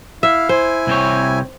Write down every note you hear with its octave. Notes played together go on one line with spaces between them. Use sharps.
E4 E5 F5
E4 C5 G#5
C2 C4 C#5